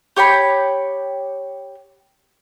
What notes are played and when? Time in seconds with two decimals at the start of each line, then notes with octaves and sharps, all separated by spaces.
0.16 G4 C#5 G5 B5